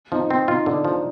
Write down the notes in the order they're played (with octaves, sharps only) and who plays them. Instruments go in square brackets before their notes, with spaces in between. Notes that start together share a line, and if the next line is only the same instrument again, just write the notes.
[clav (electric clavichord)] F3 [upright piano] D#4
[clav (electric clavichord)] C4
[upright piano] D#4 [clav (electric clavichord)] F4
[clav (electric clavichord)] D3 [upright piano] D4
[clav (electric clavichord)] F3